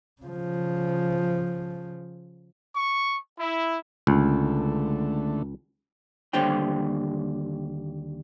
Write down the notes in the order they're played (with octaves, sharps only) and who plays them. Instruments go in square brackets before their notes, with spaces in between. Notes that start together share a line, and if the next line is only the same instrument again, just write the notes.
[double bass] C#3 F3
[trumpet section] C#6
E4
[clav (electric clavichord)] C#2 [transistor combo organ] D3 A3
[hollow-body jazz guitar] D#2 D3 G3 C5 C#5 G5